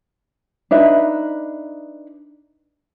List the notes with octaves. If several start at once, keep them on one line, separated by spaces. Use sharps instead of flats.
D4 D#4 B4 E5